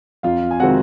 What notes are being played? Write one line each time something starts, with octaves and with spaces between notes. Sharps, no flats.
F2 F4 F5
G#5
C3 D#3 G#3 C4 F#4 F#5